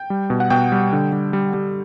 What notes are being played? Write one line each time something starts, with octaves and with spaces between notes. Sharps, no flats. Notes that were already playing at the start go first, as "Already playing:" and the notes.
Already playing: G5
G3
B2
F#5
B2 G5
G3
D3
G3
G3
G3